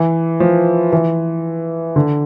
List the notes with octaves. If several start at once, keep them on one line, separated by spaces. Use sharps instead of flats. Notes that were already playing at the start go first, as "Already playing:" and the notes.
Already playing: E3
F3
E3
D3